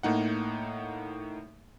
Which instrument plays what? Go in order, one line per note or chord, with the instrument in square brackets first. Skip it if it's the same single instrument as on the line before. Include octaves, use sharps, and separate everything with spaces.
[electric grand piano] A2 A#3 D#4 F#5